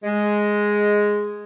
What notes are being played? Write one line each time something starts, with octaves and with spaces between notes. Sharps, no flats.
G#3